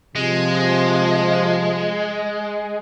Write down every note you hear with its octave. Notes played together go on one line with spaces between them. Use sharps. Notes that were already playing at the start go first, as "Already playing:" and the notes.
C3 F3 G#3